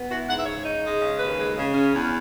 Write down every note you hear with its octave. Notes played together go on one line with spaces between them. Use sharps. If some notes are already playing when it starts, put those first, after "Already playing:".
Already playing: B3
E3 F#4
G#2 F#5
E5
C#3 C#5
D#4
G#3
C#3
D#2 B4
G#3
C#3
C#4
E2